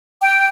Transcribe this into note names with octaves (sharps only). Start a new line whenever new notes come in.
G5